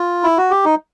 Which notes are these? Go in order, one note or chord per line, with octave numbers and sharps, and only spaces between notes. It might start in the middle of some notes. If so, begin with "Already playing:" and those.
Already playing: F4
E4
F#4
G4
D#4